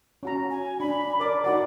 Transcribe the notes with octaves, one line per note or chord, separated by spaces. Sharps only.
C#4 F#4 A#5
G#5
D4 B5
A#4 D5 D6
D#4 F#4 D5 F#5